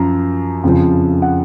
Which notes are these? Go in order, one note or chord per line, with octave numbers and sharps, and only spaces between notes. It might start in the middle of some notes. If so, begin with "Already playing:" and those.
Already playing: F#2 F3 A#5
F2 C#3 F3
F#5